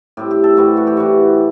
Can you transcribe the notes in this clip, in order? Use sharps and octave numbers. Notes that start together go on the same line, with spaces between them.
A2 G3 C4 G4
G4
A4
A2 E3 G3 F#4
F#4
G4
A2 E3 G3 F#4